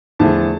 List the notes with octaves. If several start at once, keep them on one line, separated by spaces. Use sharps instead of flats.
E2 D3 F3 A3 A5